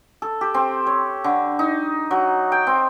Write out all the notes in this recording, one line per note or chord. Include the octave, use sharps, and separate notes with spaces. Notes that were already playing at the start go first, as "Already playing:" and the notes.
A4
G4
C4
C#5
D3
D#4
F#3
G5
C4